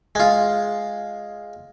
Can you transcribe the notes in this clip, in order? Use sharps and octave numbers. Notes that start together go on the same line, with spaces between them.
G#3 F4